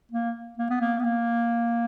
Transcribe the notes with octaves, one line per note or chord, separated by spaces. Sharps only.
A#3
A#3
B3
A#3
B3
A#3